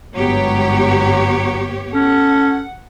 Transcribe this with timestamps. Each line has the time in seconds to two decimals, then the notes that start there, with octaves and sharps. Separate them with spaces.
0.16 G1 G#2 F#3 B3 G4 C#5
1.94 C#4 A4 F#5